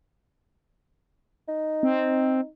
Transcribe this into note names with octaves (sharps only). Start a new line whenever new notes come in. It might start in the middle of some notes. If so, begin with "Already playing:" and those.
D#4
C4